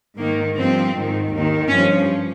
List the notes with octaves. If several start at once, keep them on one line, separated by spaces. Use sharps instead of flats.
G#2 D#3 A#3
G2 F3 C4
G#2 D#3
D#2 D#3
G2 F3 C#4